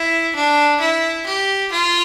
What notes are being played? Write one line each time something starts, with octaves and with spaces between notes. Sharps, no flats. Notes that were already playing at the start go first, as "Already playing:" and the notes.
Already playing: E4
D4
E4
G4
F4